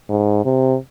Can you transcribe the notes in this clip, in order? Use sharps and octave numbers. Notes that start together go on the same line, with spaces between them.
G#2
C3